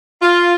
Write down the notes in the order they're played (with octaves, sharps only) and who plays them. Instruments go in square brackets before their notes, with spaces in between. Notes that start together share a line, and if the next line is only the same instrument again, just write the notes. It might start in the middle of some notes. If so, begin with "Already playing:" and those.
[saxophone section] F4